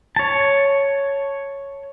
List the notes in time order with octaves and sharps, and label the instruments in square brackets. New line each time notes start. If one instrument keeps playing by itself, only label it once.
[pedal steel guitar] C#5 A5